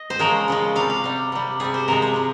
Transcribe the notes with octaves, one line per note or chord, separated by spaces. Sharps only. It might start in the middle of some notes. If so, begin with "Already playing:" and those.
Already playing: D#5
C5
C#3 F3 G#3 A#4
C#3 F3 G#3
C3 G3 F5
F5
C3 G3
C3 G3
C3 G3 G#4
C5
C3 F3 G#3 A#4
G#4
C3 F3